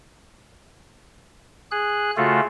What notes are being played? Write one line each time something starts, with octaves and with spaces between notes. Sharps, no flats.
G#4 F#6
C#3 A3 F4 F#4 A4